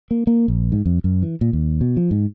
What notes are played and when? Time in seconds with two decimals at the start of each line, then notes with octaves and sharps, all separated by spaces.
0.11 A#3
0.27 A#3
0.48 A#1
0.72 G#2
0.86 F2
1.04 F#2
1.23 E3
1.41 A#2
1.53 D#2
1.81 B2
1.97 F3
2.11 G#2